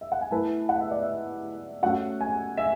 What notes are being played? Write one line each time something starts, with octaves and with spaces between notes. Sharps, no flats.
E5
F#5
G#5
A3 E4 B4 A5
F#5
E5
D5
E5
A3 C#4 F#4 F#5
G#5
E5